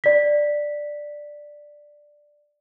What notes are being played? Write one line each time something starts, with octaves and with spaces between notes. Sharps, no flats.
D5 B6